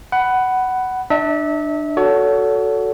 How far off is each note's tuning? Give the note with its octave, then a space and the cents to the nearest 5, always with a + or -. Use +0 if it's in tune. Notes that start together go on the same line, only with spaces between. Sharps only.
F#5 +15 B5 +0
D4 +25 E5 -30
F#4 +0 A4 +0 C#5 +35